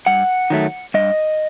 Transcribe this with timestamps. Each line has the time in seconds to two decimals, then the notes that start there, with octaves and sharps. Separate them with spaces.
0.06 G2 F#5
0.50 D#3 F#3 A3
0.94 G2 D#5